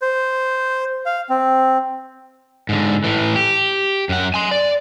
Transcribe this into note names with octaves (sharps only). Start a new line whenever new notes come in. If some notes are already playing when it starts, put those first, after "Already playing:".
C5
F5
C4
G#2 D3
A2 E3
G4
F#2 F#5
G#5 C6
D5